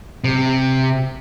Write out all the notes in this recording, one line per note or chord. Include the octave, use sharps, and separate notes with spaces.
C3